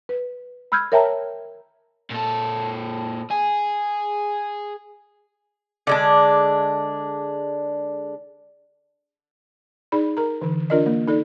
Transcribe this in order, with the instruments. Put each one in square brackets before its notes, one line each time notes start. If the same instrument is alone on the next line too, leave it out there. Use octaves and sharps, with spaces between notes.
[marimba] B4
B5 E6 F6 G6 G#6
A#4 C#5 E5 G5 A5 A#5
[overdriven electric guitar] A#2 A4
G#4
[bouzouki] D3 G#3 D4
[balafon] D#4 G#4 D5 B5
A#4 A#5
D3 E3
D4 F4 A#4 D5 D#5
A#3
D#4 A4 D5